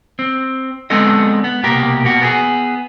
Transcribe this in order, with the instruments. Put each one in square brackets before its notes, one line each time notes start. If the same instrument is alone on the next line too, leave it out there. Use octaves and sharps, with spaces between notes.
[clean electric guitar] C4
G#3 B3 C4 D4 A4 D#5
B3
C2 B2 A#3 G4 A#4
B2 A#3 F#4
B3 G4 G#4